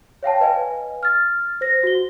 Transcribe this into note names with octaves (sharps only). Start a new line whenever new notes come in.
C#5 F5 G5 A5
B4 D#5 F5 G#5
F6 A6
C5 A#6
F#4 G7